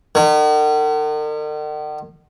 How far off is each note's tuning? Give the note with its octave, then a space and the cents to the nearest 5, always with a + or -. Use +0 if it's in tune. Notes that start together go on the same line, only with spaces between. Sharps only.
D#3 -45